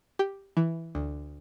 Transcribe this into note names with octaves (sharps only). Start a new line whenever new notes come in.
G4
E3
D2